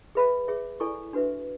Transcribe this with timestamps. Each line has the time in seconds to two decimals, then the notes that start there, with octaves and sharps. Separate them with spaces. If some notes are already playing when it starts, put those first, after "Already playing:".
0.15 G#4 B4 E5 B5
0.48 G#4 C#5 E5
0.80 E4 A4 D5 G#5 C#6
1.13 D4 F#4 B4 E5